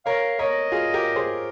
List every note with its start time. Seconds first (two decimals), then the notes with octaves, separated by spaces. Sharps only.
0.06 A#4 C#5 F5
0.39 A#4 C#5 D#5
0.72 F4 G#4
0.94 G4 A#4
1.15 G#4 C5